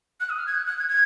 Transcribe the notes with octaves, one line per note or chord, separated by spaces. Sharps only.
F#6
D#6
F6
G#6
F#6
F#6
G#6
G#6